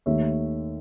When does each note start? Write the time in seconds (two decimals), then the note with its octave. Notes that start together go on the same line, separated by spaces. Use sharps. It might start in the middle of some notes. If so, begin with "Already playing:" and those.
0.06 D#2 D#3 A3 C#5 E5